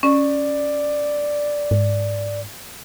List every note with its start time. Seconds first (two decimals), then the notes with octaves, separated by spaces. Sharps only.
0.03 C#4 D5
1.71 G#2